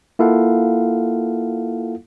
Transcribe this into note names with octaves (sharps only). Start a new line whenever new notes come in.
A#3 E4 F4 A4 F5 F#5